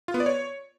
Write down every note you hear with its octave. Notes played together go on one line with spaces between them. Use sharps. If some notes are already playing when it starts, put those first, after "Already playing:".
F4
B3
D5
C#5